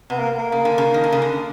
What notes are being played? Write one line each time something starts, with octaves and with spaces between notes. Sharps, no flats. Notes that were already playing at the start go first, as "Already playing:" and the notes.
C3 B3
A#3
A#3
C#3
D3
C#3
D#3
D3
C#3
D3